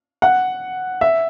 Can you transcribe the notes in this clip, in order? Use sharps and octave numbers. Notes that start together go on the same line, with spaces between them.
F#5
E5